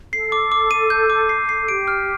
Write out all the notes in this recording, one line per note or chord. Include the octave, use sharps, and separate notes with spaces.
A4 C7
D6
D6
D#7
G6
D6
C7
C7
G4 D7
F6